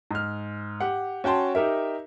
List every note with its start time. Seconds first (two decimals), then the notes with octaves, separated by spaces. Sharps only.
0.11 G#2 F6
0.80 G4 F#5
1.24 C#4 F#4 G5 A5 C6
1.55 D#4 G4 A#4 E5